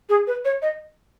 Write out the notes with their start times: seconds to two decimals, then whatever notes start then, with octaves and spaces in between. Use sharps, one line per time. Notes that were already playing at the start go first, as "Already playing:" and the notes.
0.09 G#4
0.27 B4
0.45 C#5
0.62 D#5